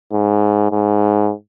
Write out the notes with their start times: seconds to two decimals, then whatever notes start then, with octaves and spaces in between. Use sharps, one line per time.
0.11 G#2
0.71 G#2